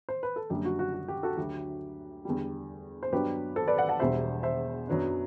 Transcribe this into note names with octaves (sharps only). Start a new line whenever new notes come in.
C5
B4
A4
F#1 F#2 D3 G3 G4
F#4
F#4
F#4
G4
F#4 A4
D2 D3 F#3 A3 G4
E2 D3 G3
C5
G2 F#3 B3 D4 G4 B4
A4 C5
B4 D5
D5 F#5
F#5 A5
E1 E2 B2 G3 C5 E5
C5 E5
F#2 F#3 B3 D4